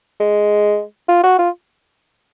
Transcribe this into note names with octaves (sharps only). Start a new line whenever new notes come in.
G#3
F4
F#4
F4